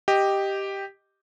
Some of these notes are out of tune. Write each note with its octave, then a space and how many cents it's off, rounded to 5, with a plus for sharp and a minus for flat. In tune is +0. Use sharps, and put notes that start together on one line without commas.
G4 +0 D#5 +0